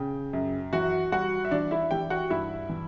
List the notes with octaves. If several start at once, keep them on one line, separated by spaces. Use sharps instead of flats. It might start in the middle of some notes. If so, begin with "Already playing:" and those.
Already playing: C#3 G5
F#2
E3 F#4 F#5
G3 F#4 F#5
E5
E3 D4 D5
E4 E5
E3 G4 G5
F#4 F#5
G2 E4 E5
E3